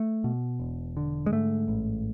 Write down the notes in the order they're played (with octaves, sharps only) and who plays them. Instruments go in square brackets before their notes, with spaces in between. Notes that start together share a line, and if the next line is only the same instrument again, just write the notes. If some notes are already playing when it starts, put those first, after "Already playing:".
Already playing: [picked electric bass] A3
B2
E1
D3
G#3
G#2 A3
A1